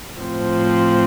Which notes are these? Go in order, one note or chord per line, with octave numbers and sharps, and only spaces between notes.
A2 F3 C4